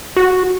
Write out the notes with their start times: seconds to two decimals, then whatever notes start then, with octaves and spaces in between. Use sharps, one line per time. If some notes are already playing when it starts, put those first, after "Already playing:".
0.16 F#4